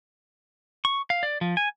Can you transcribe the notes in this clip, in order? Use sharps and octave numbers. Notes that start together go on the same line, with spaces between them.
C#6
F5
D5
F3
G#5